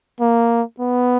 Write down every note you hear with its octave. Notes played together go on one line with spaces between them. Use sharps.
A#3
B3